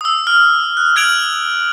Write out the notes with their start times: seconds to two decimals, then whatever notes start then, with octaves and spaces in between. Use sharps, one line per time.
0.01 D#6 E6
0.27 F6
0.77 F#6
0.96 F6 G#6 D7 F7 F#7